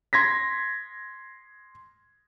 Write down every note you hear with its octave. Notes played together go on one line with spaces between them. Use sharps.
C6 G#6 A#6 B6